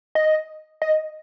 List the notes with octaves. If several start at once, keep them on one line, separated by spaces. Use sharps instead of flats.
D#5
D#5